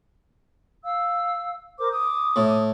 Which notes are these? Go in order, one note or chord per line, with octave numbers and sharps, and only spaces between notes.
F5 E6
A#4 C5 D6
D6 D#6
A2